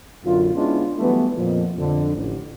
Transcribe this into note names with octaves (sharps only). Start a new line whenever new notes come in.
B1 F#2 D3 F4
G#3 B3 C#4 D4 E4 F4
E3 F#3 G3 A3 B3
F2 A#2 F3
F2 D3
A1